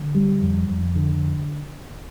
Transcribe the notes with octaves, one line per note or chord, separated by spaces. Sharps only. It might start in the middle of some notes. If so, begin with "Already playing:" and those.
Already playing: D3
G3
F2
F2
D3